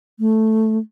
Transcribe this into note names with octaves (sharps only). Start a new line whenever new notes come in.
A3